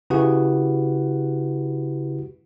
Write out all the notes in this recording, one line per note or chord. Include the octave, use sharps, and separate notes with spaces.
C#3 E4 F#4 G4 B4 F#5